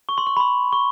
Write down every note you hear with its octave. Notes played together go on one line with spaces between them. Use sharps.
C#6
C6
C#6
B5
C6
C#6